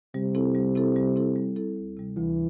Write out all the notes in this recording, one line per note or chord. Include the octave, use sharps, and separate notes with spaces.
C3 G3
C4 E4 A4
G3
C4 E4 A4
G3
C4 E4 A4
G3
C4 E4 A4
D2
C3 G3
D2 E3